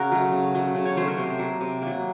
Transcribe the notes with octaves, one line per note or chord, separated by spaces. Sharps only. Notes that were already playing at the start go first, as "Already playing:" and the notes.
Already playing: C#3 F#4 A#4
F#3 A3
C#3
F#3 A3
C#3
C#5
F#3 A3 C5
A#4
C3 C5
F#3 A#3
C3
A#3
F#3